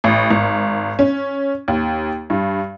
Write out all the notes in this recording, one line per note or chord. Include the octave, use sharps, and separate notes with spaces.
A1
G#1
C#4
D#2
G2